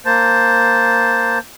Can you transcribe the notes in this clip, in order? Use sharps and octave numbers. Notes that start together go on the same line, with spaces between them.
A#3 C5 A5